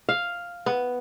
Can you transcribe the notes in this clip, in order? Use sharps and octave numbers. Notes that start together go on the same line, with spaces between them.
F5
B3